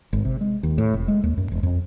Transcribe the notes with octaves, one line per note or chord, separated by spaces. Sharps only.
G#1
C3
G#3
D#2
A2
F1
G#3
D#2
F#2
E1
F2